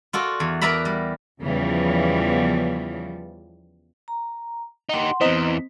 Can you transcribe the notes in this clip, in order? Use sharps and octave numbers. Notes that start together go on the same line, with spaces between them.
F4 F#4 A4 D5
E2
A#4 B4 D5 E5 A#5 B5
G3
E2 C#3 E3 F3 G3
A#5
D#4 G4 F#5 C6
E2 E3 C4 C5 D#5 A#5